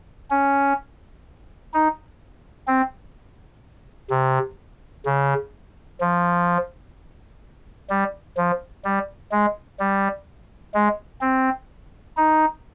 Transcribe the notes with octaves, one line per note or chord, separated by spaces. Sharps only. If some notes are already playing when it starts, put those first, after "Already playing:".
C#4
D#4
C4
C3
C#3
F3
G3
F3
G3
G#3
G3
G#3
C4
D#4